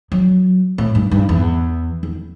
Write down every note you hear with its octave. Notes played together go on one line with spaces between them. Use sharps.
F#3
A2
G2
G2
E2
E2